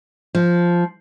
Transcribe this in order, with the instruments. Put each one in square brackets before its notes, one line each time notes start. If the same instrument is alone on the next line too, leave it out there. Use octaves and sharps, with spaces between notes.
[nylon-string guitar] F3